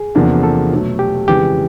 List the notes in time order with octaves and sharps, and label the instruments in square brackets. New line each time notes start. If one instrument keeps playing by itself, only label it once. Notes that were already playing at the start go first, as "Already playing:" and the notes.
Already playing: [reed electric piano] G#4
[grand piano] E2 C3 F3 A#3 D4
[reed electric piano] A4
[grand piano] B2 F#3 A3
[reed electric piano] G4
[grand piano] F2 C#3 E3 G#3 [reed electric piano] G4